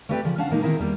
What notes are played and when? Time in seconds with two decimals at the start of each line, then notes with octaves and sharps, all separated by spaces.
0.09 A3 C4 G4 B4 D5 G5
0.24 C#3 F3 D5
0.38 C#4 D4 F5 F#5 A5
0.50 A#2 G#3 A#3 D#4 G4
0.62 D#3 C4 E4 G#4 A#4
0.79 E2 G3 A#3